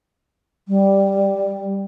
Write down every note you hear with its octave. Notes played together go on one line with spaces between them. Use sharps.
G3